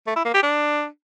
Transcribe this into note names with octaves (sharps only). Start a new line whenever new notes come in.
A3
E4
A#3
G4
D4